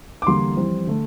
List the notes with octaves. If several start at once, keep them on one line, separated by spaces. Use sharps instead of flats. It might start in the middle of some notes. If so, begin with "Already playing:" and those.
D6
E2 D3 G3 A#3 C6
F2 E3 G3 C4
D3 A3